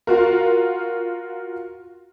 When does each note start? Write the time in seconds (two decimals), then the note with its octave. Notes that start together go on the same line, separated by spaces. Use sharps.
0.07 F4 F#4 A#4